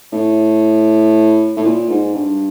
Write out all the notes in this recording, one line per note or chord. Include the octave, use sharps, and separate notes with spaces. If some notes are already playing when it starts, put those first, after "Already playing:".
A2
A2
A#2
G#2
G2